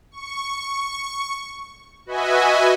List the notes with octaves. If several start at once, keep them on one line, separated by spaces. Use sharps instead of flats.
C#6
F#4 B4 D#5 E5 G#5